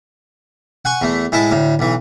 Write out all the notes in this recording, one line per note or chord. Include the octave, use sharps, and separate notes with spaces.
F#5 G#5 C#6
E2 A3
A2 G#3 E4 A5
D2 A2
B1 E3